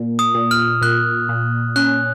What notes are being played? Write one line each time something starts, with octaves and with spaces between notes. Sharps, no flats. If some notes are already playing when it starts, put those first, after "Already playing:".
Already playing: A#2
D#6
A#2
F6
A#2 F#6
A#2
C#4 F#6